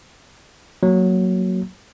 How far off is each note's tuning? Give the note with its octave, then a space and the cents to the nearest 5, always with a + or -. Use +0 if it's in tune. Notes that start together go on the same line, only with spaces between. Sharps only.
F#3 +0 A#3 +0